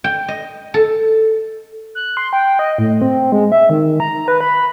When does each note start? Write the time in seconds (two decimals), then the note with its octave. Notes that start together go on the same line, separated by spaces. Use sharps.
0.04 G5
0.28 D#5
0.74 A4
1.95 F#6
2.17 C6
2.33 G5
2.59 D#5
2.78 A2
3.02 C4
3.32 G#3
3.52 E5
3.70 D#3
4.00 A#5
4.28 B4
4.41 B5